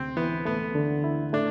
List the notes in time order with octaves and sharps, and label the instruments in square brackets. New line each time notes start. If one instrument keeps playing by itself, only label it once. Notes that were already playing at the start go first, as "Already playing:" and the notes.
Already playing: [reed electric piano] D2 C3 [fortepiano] C4
[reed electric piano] E3 [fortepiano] B3
[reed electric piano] A3 [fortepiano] B3
[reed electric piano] D3
E4
[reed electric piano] A3 [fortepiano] D4